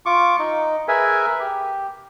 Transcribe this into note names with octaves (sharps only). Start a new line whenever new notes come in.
F4 C#6 D6
D#4
G#4 A#4 B4 E5 G#5
G4